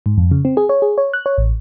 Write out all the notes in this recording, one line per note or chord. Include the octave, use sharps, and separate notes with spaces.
G#2
F2
C#3
C4
G#4
C#5
G#4
C#5
F#6
C#5
A1